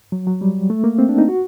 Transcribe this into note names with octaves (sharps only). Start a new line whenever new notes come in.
F#3
F#3
G3
A3
A#3
C4
D4
D#4
F#4